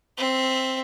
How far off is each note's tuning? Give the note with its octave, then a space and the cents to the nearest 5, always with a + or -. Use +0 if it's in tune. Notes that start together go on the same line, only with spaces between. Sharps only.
C4 +0 E5 +0